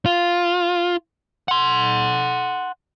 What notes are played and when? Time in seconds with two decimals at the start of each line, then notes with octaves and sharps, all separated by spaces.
0.06 F4
1.48 F#5 C6